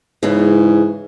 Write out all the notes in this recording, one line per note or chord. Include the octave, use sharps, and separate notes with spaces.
G#2 C#3 E3